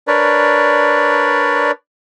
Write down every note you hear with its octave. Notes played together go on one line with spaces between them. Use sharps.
D4 A#4 B4 C#5 D5